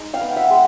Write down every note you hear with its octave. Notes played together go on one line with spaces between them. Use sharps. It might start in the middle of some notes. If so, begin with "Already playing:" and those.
Already playing: G#3 D#4
F5 G5
B3
E5 F#5
G#3